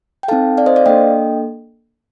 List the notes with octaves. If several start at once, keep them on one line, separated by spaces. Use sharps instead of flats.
G5
C4 D#4 A4 F5 A5
D5 F5
C5 D#5
D5 F5
A#3 D4 A4 D#5 G5